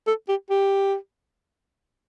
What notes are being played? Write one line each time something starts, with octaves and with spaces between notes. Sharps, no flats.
A4
G4
G4